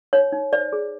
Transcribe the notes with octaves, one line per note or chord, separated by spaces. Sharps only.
D#4 C#5
D#4
C5 D5
G#4